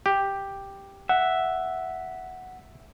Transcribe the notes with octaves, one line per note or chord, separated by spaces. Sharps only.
G4
E5 F#5